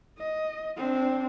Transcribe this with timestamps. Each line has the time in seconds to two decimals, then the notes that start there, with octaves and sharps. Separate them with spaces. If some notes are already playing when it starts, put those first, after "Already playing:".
0.18 D#5
0.77 C4 D4